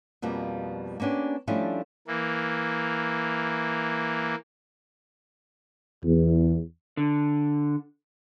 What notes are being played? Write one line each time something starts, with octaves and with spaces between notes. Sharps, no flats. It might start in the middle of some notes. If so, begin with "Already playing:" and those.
F2 B2 F3 G3 A#3
A#3 B3 C#4 D4 G4
F3 G3 A3 C#4 D4 E4
E3 A#3
E2
D3